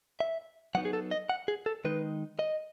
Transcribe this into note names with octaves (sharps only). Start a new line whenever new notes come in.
E5
F#3 B3 D#4 F#5
G#4
A4
D#5
F#5
G#4
A4
D#3 G#3 D#4 B4
D#5